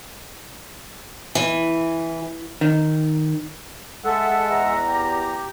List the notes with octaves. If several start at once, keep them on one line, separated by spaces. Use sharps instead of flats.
E3
D#3
G#3 A4 E5 F#5
A4
E2 A#5
G4